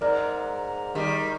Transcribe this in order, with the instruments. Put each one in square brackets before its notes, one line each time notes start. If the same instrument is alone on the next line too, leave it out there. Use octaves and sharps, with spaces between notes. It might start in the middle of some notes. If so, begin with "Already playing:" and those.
[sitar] G#2 [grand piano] A#4 D5
[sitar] D#3 G3